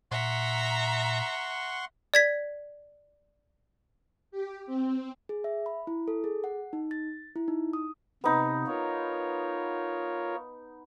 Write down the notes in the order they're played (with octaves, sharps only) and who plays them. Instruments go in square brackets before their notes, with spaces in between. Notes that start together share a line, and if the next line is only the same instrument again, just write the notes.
[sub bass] A#2 [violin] E5 A#5 [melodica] F#5 C6 C#6
[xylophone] D5 G#6 B6
[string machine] G4
C4
[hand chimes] G#4
E5
B5
E4
A4
G#4
F#5
D#4
A6
E4
D#4
D#6
[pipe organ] C3 [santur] B3 D#4
[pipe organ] F4 A#4 C#5